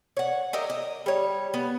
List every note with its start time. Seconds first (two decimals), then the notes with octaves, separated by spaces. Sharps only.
0.17 C#5 F#5
0.53 G4 A#4 D#5 E5
0.70 D#5
1.06 G3 C#5
1.54 B3